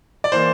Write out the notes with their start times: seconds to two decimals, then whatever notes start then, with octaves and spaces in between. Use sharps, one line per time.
0.24 D5
0.32 E3 A#3 C5